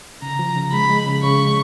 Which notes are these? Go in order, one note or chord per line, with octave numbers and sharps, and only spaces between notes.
C#3 A#5
F3
C#3
G#3 B5
G#3
C#3
C#3 C#6
G#3